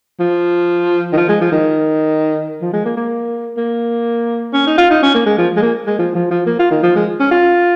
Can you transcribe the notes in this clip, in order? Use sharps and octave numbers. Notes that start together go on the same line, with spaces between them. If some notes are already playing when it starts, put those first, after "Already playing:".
F3
D#3
F3
G#3
F3
D#3
F3
G#3
A#3
A#3
A#3
C#4
D#4
F4
D#4
C#4
A#3
G#3
F3
G#3
A#3
G#3
F3
F3
F3
A#3
F4
D#3
F3
G#3
C#4
F4